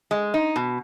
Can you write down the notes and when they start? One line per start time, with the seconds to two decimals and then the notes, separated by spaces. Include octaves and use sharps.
0.11 G#3
0.34 D#4
0.56 B2